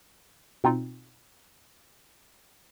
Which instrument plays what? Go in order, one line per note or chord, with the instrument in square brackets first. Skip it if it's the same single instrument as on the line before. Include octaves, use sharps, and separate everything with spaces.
[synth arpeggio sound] B2 C4 D#4 F4